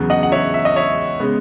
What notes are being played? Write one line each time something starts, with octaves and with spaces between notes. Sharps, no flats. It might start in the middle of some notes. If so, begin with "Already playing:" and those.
Already playing: E2 C#3 F#3 B3
D#5 F#5
F#5
C#5 E5
E5
D#5
C#5 E5
C#3 G#3 B3